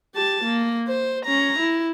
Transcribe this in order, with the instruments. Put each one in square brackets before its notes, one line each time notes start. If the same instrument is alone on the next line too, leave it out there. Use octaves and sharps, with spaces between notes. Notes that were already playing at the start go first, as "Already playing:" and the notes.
[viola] G4 A5
A#3
C5
C#4 A#5
E4